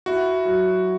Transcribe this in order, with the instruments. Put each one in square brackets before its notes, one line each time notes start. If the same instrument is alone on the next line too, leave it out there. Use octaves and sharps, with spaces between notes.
[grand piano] E4 [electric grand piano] F#4
[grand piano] F#3